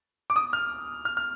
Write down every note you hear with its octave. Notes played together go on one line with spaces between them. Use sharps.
D6
D#6
F6
F6
F6